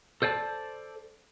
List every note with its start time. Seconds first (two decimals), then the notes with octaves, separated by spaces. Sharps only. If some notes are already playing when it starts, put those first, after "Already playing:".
0.22 A4 C5 D5 G5 A5